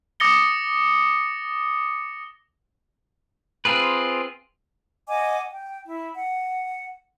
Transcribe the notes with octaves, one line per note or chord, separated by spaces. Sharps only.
D6 D#6 A6 A#6 C#7 G7
C4 F4 G#4 B4
D#5 F#5 G#5 D6
G5
E4
F#5